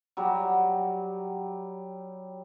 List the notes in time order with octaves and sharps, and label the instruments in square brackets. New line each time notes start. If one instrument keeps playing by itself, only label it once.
[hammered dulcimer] F#3 G3